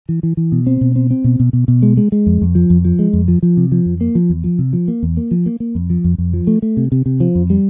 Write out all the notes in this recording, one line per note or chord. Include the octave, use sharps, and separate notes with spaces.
E3
E3
E3
B2
C4
B2
C4
C4
B2
B2
B2
B2
G#3
G#3
G#3
F2
F2
F3
F2
F3
G#3
F2
F3
F3
C3
F3
F2
A#3
F3
E2
F3
C3
F3
A#3
E2
A#3
F3
A#3
A#3
F2
F3
F2
F2
F3
A3
A3
C3
C3
C3
F3
F2
G3